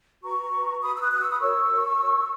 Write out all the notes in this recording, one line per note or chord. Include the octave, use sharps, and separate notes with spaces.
F#4 B4 A#5 C#6
F#4 B4
F#4 B4 B5 D#6
E6
D#6 F#6
F#4 B4 D#6 F#6
C#6 E6
B5 D#6
F#4 A#4 C#5 C#6 E6
F#4 A#4 C#5
F#4 A#4 C#5